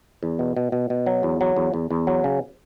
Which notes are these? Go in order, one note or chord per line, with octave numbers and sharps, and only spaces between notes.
E2
B2
B2
B2
B2
F#3
E2
F#3
E2
E2
E2
F#3
C#3